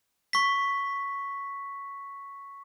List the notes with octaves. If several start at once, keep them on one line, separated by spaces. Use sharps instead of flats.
C#6 B6